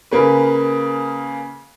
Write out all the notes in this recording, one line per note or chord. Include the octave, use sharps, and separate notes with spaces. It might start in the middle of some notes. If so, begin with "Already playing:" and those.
C#3 A#3 B4